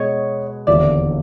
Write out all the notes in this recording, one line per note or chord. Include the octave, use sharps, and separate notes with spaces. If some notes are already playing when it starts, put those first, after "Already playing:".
Already playing: B2 G#3 B3 C#5 D#5
E1 D#2 D3 D5 E5